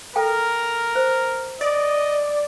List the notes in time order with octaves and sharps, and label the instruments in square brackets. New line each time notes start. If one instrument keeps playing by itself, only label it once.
[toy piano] A4 G5 [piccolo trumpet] A#4
[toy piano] C5
[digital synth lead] D5 [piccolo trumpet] D#5